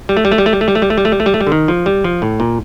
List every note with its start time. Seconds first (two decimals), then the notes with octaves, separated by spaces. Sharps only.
0.09 G3
0.17 A3
0.25 G3
0.32 A3
0.38 G3
0.46 A3
0.53 G3
0.61 A3
0.68 G3
0.75 A3
0.82 G3
0.90 A3
0.98 G3
1.05 A3
1.12 G3
1.20 A3
1.26 G3
1.34 A3
1.41 G3
1.47 D3
1.52 D#3
1.68 F3
1.86 G3
2.04 F3
2.22 A2
2.40 A#2